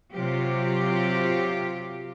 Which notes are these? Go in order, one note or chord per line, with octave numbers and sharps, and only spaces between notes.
C3 F#3 F4 G4